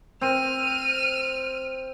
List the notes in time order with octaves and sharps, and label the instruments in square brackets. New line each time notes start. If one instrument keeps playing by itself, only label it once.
[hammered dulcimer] C4 [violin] F6 D#7